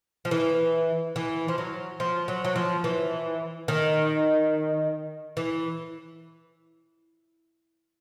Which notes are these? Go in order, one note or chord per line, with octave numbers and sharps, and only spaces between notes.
F3
E3
E3
F3
F#3
F3
F#3
F#3
F3
E3
D#3
E3